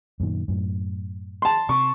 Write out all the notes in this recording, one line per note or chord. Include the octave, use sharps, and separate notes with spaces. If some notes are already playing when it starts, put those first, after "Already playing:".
F#2 A#2 D#3
F#2 A2
A5 C6
C3 C#6